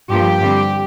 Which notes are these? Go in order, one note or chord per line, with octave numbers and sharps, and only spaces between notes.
G2 F3 A#3 G4
G2 D3 G3 C4